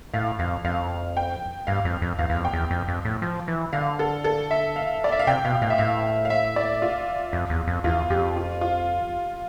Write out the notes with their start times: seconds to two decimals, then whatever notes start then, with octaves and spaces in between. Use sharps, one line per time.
0.14 A2 F5
0.39 F2 F5
0.65 F2 F5
1.17 G5
1.67 G2 F5
1.85 F2
2.02 F2
2.19 E2 F5
2.30 E2
2.36 F2
2.45 G5
2.53 E2
2.71 F2
2.88 F2
3.05 A2
3.22 F3
3.48 E3
3.73 D3 F5
3.99 A4
4.24 A4
4.51 E5
4.76 F5
5.04 D5
5.12 E5
5.19 F5
5.27 C3 G5
5.44 B2 F5
5.62 A2 F5
5.70 E5
5.78 A2 F5
6.25 F5
6.30 E5
6.56 D5
6.82 F4
7.33 F2
7.50 E2
7.67 F2
7.84 E2 F4
8.10 F2 G4
8.36 F4
8.61 F4